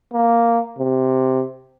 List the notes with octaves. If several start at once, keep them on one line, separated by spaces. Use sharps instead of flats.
A#3
C3